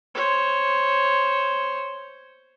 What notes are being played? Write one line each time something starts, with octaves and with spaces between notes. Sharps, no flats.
C5 C#5